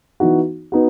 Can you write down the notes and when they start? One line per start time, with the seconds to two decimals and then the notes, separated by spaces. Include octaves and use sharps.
0.20 E3 B3 D#4 F#4
0.72 B3 D#4 F#4